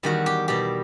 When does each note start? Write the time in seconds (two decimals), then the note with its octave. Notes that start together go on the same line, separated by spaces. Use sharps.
0.03 E2 D#3 G3 F#4
0.26 G4
0.48 B2 G3 G4